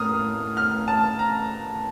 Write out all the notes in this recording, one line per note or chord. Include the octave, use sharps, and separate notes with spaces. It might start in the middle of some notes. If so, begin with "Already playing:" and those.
Already playing: A2 A#3 D#6 F6
F6
A5
A#5